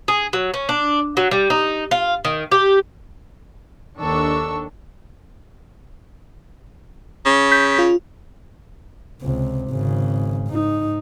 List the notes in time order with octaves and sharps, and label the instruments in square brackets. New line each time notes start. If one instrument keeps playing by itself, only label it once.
[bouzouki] G#4
F#3
C#4
D4
F#3
G3
D#4
F4
D#3
G4
[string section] D#2 D#3 D4 A4 C#6 E6
[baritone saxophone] C#3
[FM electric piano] G6 B6
F4
[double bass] C#2 C3
G#1 C#3
G#2 D#4